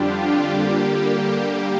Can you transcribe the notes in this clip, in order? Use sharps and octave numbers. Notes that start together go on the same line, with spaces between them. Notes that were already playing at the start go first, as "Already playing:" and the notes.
Already playing: F2 D3 G3 D4 F4 G4
D3 G3 A#3 G4